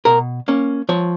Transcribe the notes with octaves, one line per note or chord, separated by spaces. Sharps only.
B2 A#4
A#3 C#4
F3 C#5